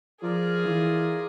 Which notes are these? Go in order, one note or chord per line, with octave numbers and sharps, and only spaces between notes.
F3 F4 G#4 A#4 D5
E3